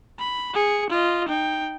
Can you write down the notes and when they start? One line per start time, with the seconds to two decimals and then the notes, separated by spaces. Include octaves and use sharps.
0.19 B5
0.54 G#4 C#7
0.90 F4 D#5
1.29 D#4 G5